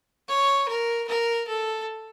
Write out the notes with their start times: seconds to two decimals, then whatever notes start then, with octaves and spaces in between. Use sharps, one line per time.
0.29 C#5
0.68 A#4
1.08 A#4
1.48 A4